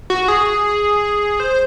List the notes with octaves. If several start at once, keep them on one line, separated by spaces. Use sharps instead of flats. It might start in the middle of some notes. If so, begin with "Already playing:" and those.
F#4
G#4
C5